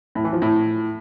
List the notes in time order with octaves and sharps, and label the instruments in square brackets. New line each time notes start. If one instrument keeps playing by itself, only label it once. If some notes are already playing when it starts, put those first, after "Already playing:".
[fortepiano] A2
E3
F3
A2